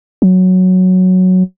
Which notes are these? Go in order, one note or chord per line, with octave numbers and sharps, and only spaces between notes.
F#3